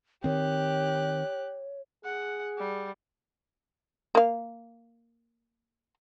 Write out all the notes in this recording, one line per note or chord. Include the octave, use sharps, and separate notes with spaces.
D#3 C4 G4 C#5 F#6
G#4 F#5
G3
A#3 F5